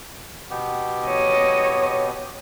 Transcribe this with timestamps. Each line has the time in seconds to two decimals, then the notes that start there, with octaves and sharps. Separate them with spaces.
0.50 B2 B3 G4
1.06 C#5 D#5